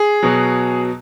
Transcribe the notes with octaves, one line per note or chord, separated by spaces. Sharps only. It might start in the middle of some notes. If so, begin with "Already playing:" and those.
Already playing: G#4
B2 F#3